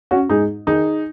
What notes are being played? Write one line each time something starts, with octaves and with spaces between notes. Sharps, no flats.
C#4 F#4
G#2 D#4 G#4
D#3 D#4 G#4